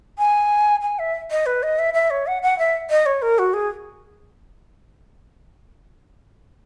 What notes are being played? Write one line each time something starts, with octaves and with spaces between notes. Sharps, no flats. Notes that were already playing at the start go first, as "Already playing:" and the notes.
G#5
G#5
E5
D#5
B4
D#5
E5
E5
C#5
F#5
F#5
E5
D#5
C#5
A#4
F#4
G#4